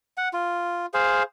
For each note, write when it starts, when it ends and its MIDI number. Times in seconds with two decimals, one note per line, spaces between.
0.17 0.28 78
0.33 0.86 65
0.94 1.23 68
0.94 1.23 72
0.94 1.23 77